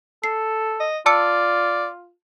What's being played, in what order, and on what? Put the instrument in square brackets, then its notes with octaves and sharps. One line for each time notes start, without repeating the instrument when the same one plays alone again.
[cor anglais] A4 [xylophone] C7
[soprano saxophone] D#5
[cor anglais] F4 [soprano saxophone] D5 [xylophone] A5 E6 C#7